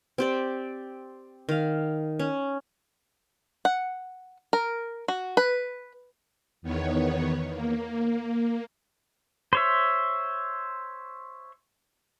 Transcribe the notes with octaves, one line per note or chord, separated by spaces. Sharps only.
C4 G4 D5
D#3 F5
C#4
F#5
A#4
F#4
B4
E2 D#3 B3 C#5
A#3
C5 C#5 E5